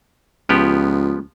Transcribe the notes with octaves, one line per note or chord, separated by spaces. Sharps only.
C#2 F3 B3 G4